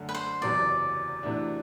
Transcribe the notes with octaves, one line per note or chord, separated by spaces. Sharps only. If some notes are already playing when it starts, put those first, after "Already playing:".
Already playing: F#2 D3 A3
B4
C5
F#1 E2 C3 F#3 B3 D5
C3 E3 A3 D4 F#4